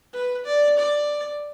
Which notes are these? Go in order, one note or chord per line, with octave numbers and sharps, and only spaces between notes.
B4
D5
D5